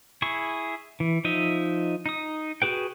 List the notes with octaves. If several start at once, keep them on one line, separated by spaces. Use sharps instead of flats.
E4 G#4 C#6
E3
F3 D#4 D#5 E5
D#4 D#6
F#4 G#4 B4 G5